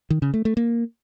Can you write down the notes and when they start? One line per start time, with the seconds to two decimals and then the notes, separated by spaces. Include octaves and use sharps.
0.10 D#3
0.22 C#3
0.34 A3
0.45 A3
0.57 A#3